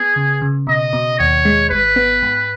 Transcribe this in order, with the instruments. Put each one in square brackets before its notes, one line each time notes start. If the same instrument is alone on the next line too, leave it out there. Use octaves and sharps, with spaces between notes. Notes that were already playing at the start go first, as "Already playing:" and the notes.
Already playing: [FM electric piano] B3 [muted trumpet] G#4
[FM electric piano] C#3
C#3
[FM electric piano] B2 [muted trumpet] D#5
[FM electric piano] B2
[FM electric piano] D#2 [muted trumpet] C#5
[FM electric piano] G#3
[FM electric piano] G#1 [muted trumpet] B4
[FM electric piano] B3
G#2